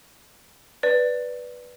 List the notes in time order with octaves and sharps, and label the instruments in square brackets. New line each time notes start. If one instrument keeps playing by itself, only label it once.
[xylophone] B4 D5